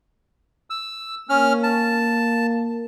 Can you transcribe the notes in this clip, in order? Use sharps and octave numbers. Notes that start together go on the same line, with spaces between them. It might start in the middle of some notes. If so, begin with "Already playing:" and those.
E6
A#3 C#4 F6
A5